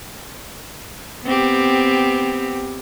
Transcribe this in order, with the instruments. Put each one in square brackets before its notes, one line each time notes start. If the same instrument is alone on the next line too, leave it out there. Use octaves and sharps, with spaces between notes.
[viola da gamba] B3 C4 G4